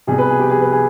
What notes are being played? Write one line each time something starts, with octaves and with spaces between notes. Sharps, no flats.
C2 B2 G#4
B4
G#4
G4
G#4
B4
G#4